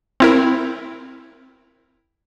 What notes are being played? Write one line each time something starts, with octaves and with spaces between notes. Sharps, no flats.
C4 E4 A#4